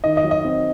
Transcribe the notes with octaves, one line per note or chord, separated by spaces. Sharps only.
D#3 D#5
D#5
F#3
D#5
C4